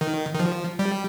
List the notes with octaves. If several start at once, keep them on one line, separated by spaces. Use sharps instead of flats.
D#3
D#3
F3
G3